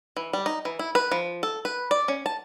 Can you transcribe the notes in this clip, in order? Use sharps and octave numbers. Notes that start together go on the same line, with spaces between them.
E3
G3
D#4
E3
E4
B4
F3
A4
B4
D5
C#4
A5